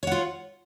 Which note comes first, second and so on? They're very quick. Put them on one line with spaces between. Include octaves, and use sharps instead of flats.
C#5 F#5 F4